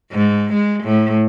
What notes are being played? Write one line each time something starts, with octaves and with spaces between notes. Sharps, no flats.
G#2
G#3
A2